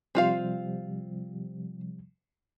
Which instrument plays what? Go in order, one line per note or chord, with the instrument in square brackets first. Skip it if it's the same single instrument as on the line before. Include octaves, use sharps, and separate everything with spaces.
[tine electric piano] C3 F3 G3 [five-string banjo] C4 F4 F5